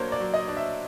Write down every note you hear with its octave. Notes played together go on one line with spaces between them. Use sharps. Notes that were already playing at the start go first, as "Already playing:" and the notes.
Already playing: F#3 A#3 D4 C5 C#5
D5
F#3
D#5
D4
E5